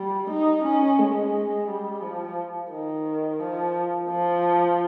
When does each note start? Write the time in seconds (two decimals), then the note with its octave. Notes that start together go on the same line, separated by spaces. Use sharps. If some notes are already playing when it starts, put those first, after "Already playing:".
Already playing: G3
0.30 D#4
0.64 C#4
0.99 G#3
1.68 G3
2.02 F3
2.71 D#3
3.40 F3
4.09 F3